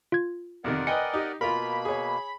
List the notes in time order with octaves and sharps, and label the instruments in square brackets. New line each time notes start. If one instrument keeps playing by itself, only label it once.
[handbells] F4 G#6
[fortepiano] F2 C3 D#3 [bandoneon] A#4 D5 F#5
[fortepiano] B4 G5 G#5 [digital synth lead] D#5 [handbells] C#7
[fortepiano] D#4 G4
[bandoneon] B2 A#3 [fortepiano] F4 A#4 [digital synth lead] B5
[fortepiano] G#4 C#5